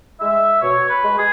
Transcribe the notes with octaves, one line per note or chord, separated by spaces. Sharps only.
G#3 E5
B2 C#5
B4
G#3
G#4